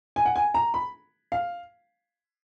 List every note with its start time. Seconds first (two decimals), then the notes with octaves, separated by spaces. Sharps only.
0.16 G#5
0.25 F#5
0.36 G#5
0.54 A#5
0.74 B5
1.32 F5